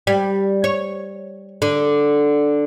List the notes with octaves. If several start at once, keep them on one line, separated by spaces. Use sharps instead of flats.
G3
C#5
D3